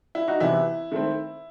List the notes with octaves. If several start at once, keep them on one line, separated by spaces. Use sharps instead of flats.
E4
D#4 F#4
C3 E3 B3 E4
D#3 A3 C4